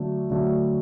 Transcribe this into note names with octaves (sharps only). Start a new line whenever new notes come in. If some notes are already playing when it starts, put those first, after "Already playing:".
Already playing: D3 F#3 A3
D3 F#3 A3